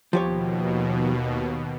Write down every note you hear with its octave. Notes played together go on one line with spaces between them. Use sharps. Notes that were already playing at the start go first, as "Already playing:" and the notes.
D#2 B2 F3 G4 C#5